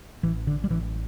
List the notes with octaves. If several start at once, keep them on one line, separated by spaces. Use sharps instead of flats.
A1 E3
D3
G3
A1 E3